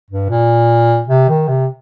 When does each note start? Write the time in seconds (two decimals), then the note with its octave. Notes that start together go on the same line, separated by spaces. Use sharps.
0.11 G2
0.30 A#2
1.08 C3
1.29 D#3
1.48 C3